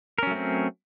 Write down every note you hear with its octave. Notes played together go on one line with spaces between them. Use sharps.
F#3 A3 C4 C#4 A#4